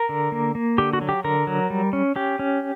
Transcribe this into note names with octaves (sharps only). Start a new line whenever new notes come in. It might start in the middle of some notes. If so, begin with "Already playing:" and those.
Already playing: A#4
D3
A#3
A#3
D3 G4
F#4
F#3
G4
D3 A#4
F#3
G3
C#4
C#4 G4
C#4